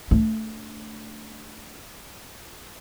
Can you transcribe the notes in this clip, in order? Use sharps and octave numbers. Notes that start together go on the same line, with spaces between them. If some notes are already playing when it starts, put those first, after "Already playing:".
A3 D4